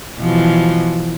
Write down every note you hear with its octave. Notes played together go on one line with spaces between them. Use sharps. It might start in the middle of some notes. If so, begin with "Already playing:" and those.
B2 E3 F3